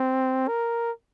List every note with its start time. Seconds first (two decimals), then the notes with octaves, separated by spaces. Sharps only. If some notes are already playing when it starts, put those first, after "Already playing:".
Already playing: C4
0.48 A#4